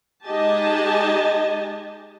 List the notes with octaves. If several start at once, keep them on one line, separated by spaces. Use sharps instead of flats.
G#3 D#4 G4 D#5 G#5 A5